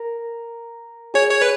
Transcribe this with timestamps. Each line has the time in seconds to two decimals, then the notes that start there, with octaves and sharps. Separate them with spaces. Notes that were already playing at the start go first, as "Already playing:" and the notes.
Already playing: A#4
1.14 G#4 C#5
1.31 C#5
1.41 B4